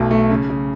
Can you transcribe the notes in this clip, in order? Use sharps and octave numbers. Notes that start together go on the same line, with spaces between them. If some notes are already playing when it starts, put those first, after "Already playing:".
Already playing: B1 F#3 A3
A3
C#3
C#3